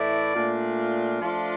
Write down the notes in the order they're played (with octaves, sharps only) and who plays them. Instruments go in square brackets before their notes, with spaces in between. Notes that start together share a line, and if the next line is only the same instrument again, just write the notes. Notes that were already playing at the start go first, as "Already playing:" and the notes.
Already playing: [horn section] A2 E3 A3 E4 D5
A#2 A3 D4 F4
F3 A3 D4 F4